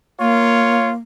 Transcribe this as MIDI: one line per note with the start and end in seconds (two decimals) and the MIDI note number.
0.20 0.98 58
0.20 0.91 65
0.20 0.91 73